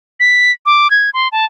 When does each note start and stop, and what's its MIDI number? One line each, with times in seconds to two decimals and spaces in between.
0.20 0.52 95
0.66 0.90 86
0.91 1.10 92
1.14 1.28 84
1.32 1.45 81